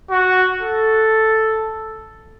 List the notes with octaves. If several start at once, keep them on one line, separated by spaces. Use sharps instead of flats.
F#4
A4